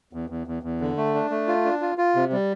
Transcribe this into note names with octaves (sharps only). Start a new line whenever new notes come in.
E2
E2
E2
E2
D3
A3
D4
A3
F4
D4
F4
F4
C3
G3